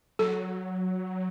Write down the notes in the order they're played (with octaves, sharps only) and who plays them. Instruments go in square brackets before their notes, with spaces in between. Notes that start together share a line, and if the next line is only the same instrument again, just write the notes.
[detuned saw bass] F#3 [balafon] A4